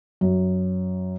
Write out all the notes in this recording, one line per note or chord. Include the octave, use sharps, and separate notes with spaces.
F#2